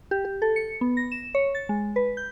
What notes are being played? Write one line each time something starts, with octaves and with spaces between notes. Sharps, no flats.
G4
G4
A4
C#7
B3
A#6
E7
C#5
A6
G#3
B4
G6